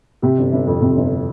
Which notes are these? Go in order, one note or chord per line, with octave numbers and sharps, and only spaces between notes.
C3 G4
G1
G1
F2
C3
G1